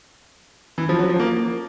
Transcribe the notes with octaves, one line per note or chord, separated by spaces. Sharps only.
E3
F3
F#3
F3
A#3